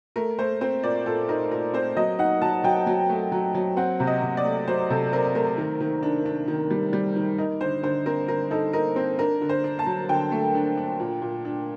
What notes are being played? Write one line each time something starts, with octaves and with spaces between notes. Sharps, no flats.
A3 A#4
A3 C5
C4 C5
A#2 D5
A#2 A4
D#4 A#4
A#2 A#4
C4 C5
F#3 D#5
D#4 F#5
F#3 A5
F#3 G5
F#3
A3
F#3
F#3
C4 F#5
C3
D#5
C3
D5
A3
F#3 C5
C3 A4
C4 A#4
A3 A#4
D#3
D#3
D4
D4
D#3
G3
G3
D#3
D#4 A#4
D3 C5
D3 C5
C4 A#4
D3 A#4
D#4 A4
D#4 A#4
C4
D4 A#4
D3
C5
D4
A5
F#3
D3 G5
A3
D4
D4
A#2
A#2
D4